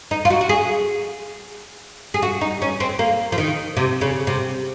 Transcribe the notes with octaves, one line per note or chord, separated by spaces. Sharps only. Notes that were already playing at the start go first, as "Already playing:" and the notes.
D#4
F4
F#4
F#4
G#4
G#4
F#4
D#4
C#4
C4
A#3
F3
D#3
C3
C#3
C3